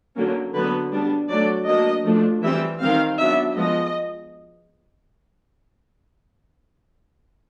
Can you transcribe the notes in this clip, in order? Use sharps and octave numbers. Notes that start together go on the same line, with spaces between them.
D3 F#3 A#3 C#4
D3 F#3 B3 B4
G3 B3 D4
F#3 A3 D4 D5
F#3 A#3 D4 D#5
F3 A3 D4
E3 G3 C4 E5
D#3 G3 C4 F5
F#3 B3 D4 E5
F3 G#3 B3 D#5